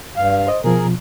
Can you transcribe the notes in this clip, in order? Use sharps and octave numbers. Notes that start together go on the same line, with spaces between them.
G2 F5
C5 D#5
B2 F3 G#4 A#4